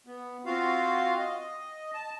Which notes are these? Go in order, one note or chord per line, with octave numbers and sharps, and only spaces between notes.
B3
C4 F4 F#4 F5
D#5
A5